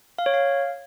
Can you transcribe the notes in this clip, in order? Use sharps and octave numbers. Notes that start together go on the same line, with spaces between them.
F5
C#5
F5